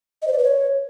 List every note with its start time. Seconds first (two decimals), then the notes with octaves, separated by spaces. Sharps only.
0.22 D#5
0.27 C5
0.33 D5
0.38 B4
0.44 C#5